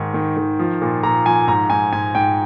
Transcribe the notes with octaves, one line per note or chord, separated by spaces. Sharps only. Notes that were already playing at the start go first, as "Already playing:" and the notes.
Already playing: G#2 D#3
D#3
D#3
F3
A#2
A#2 A#5
F3 G#5
G#2 A#5
G#2 G#5
G#2 G#5
G#2 G5